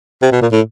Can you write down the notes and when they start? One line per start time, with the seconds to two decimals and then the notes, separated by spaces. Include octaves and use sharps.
0.22 C3
0.32 B2
0.42 A#2
0.52 A2